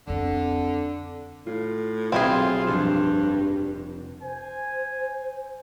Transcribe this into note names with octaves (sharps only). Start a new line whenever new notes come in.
F2 D3 C4
A2 F4
B1 C4 E4 F4 G#4
F1 G2 E7
C5 G#5